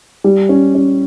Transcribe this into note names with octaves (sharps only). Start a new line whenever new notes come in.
G3
C#4
C#4